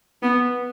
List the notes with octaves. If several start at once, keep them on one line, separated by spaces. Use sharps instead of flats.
B3